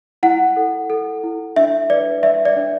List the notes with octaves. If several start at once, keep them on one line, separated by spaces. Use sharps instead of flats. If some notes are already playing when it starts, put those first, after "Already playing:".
E4 F#5
A4
A4
E4
D4 E5
B4 D5
D5 E5
D5
D4